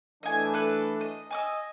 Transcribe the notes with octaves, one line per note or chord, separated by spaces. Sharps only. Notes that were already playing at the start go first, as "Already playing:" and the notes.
E3 A3 D4 D#5 G#5
A4 B4
D#5
D#5 G#5 D6 E6